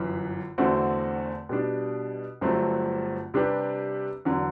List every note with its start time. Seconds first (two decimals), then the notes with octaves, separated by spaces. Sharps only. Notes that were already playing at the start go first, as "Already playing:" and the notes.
Already playing: G1 F#2 E3
0.58 E2 D3 A3 C4 F#4
1.49 B2 G3 D4
2.41 G1 G2 F#3 A3 C4
3.34 C3 G3 D4 G4 B4
4.25 E2 D3 F#3